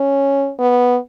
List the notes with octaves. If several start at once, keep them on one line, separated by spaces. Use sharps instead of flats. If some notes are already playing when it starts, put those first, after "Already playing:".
Already playing: C#4
B3